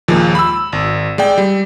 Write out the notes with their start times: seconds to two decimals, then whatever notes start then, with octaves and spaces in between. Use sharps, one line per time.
0.08 D#2 A#2 F3 G#3
0.35 B5 E6
0.73 G#1
1.18 G#3 D5 G5
1.38 G3